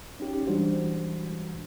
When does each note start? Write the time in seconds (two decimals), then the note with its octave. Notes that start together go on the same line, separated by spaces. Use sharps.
0.20 C#4 D#4 G4
0.47 E3 G3 G#3 D4 F#4 C5